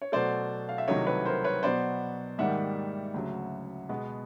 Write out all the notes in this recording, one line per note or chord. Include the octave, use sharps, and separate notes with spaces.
C#5
B2 F#3 A3 C5 D5
F5
E5
C2 C3 D#3 F#3 A3 C#5 D#5
B4 C#5
A#4 C5
B4 C#5
B2 F#3 B3 C5 D5
G#2 D#3 G3 A#3 E5 F#5
D2 C#3 F#3
B2 G#3 B3